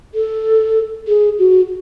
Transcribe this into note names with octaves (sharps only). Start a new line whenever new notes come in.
A4
G#4
F#4